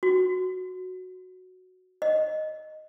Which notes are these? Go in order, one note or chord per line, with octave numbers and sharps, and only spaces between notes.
F#4
D#5